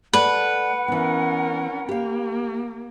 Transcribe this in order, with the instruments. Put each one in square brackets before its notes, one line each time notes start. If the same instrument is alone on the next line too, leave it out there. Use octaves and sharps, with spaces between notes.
[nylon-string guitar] A3 D5 [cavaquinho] B4 [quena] F#5
[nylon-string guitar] E3 B3 [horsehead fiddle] C#4 A#4
[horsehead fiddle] A#3 [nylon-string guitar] G4 F5